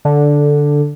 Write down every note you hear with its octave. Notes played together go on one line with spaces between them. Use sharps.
D3